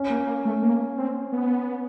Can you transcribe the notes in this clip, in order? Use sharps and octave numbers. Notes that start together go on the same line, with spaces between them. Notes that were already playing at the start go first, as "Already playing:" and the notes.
Already playing: C#4
A#3
A#3
A3
A#3
C4
B3